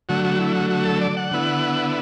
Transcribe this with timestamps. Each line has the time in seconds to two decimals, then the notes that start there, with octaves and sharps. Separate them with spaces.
0.09 D3 F#3 A3 F#4
0.25 F#4
0.39 E4
0.55 F#4
0.70 F#4
0.85 A4
1.01 D5
1.17 F#5
1.31 D3 B3 E4